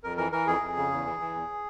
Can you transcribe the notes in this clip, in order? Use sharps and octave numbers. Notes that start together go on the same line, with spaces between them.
F2 A#4
E3 A#4
E3 A#4
F2 G#4
F2
C#3
E2
E3
E3
E2